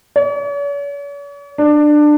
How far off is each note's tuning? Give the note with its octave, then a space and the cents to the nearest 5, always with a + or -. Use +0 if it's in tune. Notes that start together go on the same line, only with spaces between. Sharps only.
C#5 +45
D4 +20